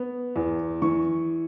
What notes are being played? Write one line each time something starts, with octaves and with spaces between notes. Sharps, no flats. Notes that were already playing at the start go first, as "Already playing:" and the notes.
Already playing: B3
E2
E3 C#6